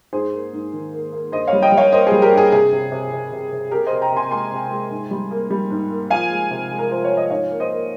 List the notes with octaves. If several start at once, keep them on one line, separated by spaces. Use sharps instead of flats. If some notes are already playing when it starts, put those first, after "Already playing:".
G#2 G#4 C5
A#3
G#2
D#3
A#3
A#3
G2 C5 D#5
C#5 F5
G3
D#5 G5
G3
C#5 F5
A#3 C5 D#5
G3 G#4 C5
G4 A#4
G2
G#4
C3 G#4
C3
C3
C3
C3
C3
C3 G4 A#4
C5 D#5
C3
G5 A#5
C3
G#5 C6
G#3 G#5 C6
C3
G#3
G#2
G3
A#3
G3
G#2
A#3
F3 F5 G#5
G#3
C3
G#3
A#4
F3 C5
C#5
F3
D#5
G#2 C#5 F5
A#3
C5 D#5
A#3